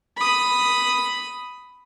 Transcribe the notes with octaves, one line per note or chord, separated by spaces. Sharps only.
B5 D#6